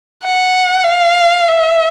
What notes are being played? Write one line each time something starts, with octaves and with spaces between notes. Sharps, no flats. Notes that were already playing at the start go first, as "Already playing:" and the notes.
F#5
F5
E5